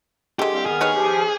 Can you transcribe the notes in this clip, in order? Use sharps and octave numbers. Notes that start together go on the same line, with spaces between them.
D3 G#3 G4
C2 C4 F5
D#3 B3 G#4 F6
D#4 B4 C#5
F3 G4